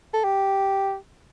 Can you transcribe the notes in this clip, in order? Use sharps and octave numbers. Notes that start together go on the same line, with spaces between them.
A4
G4